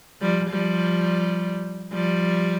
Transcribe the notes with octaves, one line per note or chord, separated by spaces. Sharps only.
F3 G3
F3 G3
F3 G3